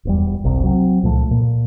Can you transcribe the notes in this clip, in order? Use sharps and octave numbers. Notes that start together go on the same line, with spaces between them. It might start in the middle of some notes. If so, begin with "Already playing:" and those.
D#1 E2 G3
F#1 C2 C3
F#3 C4
C#2 A#2 F3 A3
A#2